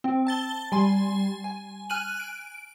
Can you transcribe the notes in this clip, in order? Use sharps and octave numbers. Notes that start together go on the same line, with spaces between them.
C4
A5 A6 G7
G3 G#5 C6
G#5
G#5 F6 F#6 D#7 F#7
D7